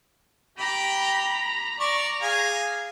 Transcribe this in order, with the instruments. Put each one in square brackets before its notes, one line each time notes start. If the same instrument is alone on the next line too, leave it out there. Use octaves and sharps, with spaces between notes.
[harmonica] G4 G5 [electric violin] A#5 B5
[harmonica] D5 C#6 D6 [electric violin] A#5
[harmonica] G#4 F5 G#5